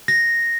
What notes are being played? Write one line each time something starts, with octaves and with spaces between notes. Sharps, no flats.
A#6